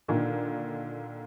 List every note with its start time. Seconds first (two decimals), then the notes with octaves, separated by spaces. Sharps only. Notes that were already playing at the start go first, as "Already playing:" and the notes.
0.08 A#2 D3 D#3